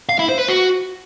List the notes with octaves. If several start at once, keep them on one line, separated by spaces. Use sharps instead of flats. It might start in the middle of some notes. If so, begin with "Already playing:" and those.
F5
E4
C5
B4
F#4